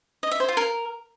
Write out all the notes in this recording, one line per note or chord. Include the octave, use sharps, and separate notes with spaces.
D#5
E5
C5
F4
A#4